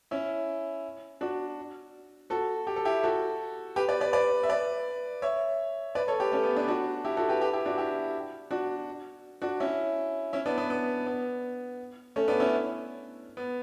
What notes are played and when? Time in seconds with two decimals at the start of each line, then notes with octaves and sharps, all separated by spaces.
0.11 C#4 E4
1.21 D4 F#4
2.30 F#4 A4
2.67 G4
2.76 A4
2.85 E4 G4
3.04 F#4 A4
3.76 G4 B4
3.89 B4 D5
4.01 B4 D5
4.13 B4 D5
4.43 E5
4.49 B4 D5
5.22 C#5 E5
5.95 B4 D5
6.08 A4 C#5
6.20 G4 B4
6.32 A3 C#4
6.44 B3
6.56 B3 D4
6.68 D4 F#4
7.04 E4 G4
7.17 F#4 A4
7.29 G4 B4
7.41 G4 B4
7.53 E4 G4
7.66 D4 F#4
7.78 E4 G4
8.51 D4 F#4
9.42 D4 F#4
9.60 C#4 E4
10.33 C#4 E4
10.46 B3 D4
10.58 B3
10.70 B3
11.06 B3
12.16 A3 C#4
12.28 B3 D4
12.40 C#4 E4
13.37 B3